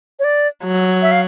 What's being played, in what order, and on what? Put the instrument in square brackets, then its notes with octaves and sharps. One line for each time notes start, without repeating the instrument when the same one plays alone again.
[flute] C#5
D5
[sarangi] F#3
[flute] E5
F5